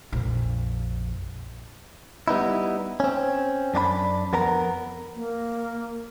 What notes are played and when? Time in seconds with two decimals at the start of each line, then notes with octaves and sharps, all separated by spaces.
0.12 A#1 F2
2.28 G3 B3 D#4 E4
3.00 C4 C#4
3.74 F#2 D4 F#4 B5
4.33 F2 B3 A#4 A#5
5.15 A#3